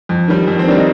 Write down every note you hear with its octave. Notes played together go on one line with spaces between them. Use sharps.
F2
D#3 G3
F2
C4
D#3 G3 D4
D#4